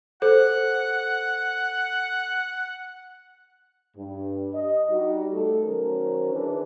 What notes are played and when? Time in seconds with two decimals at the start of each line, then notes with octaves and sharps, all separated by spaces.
0.22 A4 C5 F#5
3.95 G2
4.53 D#5
4.89 G3 D#4 F#4
5.31 A3 A4
5.63 D#3 F#3 C#4 A#4 C5
6.33 E3 D4 G#4